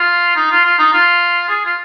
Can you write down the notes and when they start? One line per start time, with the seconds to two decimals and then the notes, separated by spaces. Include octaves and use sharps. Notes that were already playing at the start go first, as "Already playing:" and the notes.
Already playing: F4
0.36 D#4
0.51 F4
0.65 F4
0.79 D#4
0.93 F4
1.49 G#4
1.65 F4